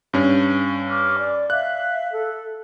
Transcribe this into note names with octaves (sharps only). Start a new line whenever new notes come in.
G2 C#4
D6 F6
D5
E5 F5 F#6
A4